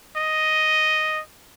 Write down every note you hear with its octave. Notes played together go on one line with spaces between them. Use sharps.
D#5